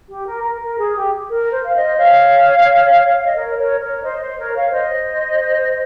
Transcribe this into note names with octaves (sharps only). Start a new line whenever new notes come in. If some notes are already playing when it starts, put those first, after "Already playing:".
G4
A#4
A#4
A#4
G#4
G4
A#4
C5
F5
C5 D#5
C#5 F5
F5
D#5
A#4 C#5
A#4 C#5
A#4 C#5
C5 D#5
C5
A#4 C#5
C#5 F5
C5 D#5